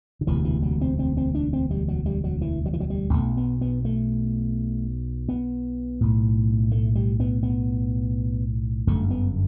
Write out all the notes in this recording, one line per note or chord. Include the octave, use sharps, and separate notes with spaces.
D3
E1 D2 C3 E3
E3
F#3
C4
C4
C4
D4
C4
G3
F#3
G3
F#3
E3
F#3
E3
F#3
G3
B1 B2 A3
B3
B3
A3
B3
B1 A2
A3
G3
B3
B3
G1 F#2 D3 A3
B3